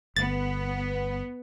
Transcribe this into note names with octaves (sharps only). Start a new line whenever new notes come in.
G1 B3 A6